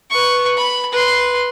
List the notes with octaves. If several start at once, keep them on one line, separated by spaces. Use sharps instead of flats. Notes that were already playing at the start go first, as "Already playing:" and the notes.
B4 C#6
B5
B4 C6